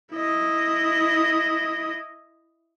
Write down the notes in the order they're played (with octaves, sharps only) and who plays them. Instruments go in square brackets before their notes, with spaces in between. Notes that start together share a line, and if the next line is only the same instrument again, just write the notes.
[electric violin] E4 D#5